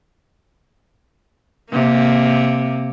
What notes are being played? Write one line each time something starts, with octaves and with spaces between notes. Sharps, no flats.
C3 A#3